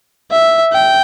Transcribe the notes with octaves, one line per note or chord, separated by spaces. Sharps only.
E5
G5